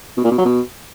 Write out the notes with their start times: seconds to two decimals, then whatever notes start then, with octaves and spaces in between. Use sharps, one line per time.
0.17 B2
0.24 A#2
0.31 B2
0.38 F#3
0.45 B2